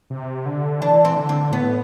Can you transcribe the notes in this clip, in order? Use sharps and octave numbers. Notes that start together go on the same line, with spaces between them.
C3
D3
E3 D4
C4
D3
C4
A2 B3